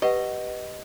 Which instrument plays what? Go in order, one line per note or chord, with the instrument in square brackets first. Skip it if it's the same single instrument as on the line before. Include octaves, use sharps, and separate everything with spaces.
[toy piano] G4 B4 F#5 [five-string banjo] D#5